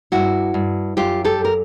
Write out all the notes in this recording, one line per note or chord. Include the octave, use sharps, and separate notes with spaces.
G2 E4 F#4
G2
F#2 F4 G4
G4 A4
F#2
A#4